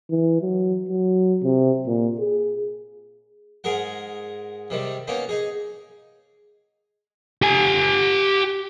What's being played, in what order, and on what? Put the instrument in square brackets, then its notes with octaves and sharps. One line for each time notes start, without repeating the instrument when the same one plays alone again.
[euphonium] E3
F#3
F#3
C3
A#2
G#4
[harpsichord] G#2 G#4 A#4 F#5
C3 D#3 G3
A#3 B3 C#4 D#4
D#4 G#4
[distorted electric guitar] G4 G#5